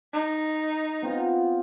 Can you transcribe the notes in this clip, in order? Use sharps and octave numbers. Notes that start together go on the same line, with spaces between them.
D#4
B3 C4 F4